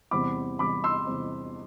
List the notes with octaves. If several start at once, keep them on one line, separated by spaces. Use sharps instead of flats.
E2 C3 G3 C4 B5 D6
E2 C3 G3 C4 B5 D6
C6 E6
E2 C3 G3 C4